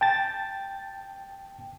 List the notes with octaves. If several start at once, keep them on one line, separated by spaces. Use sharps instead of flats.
G5 A5 A6